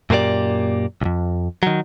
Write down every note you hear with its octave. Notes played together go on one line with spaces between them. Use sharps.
F#2 A#2 A#3 G4 D5
B1 F2
D#3 F#3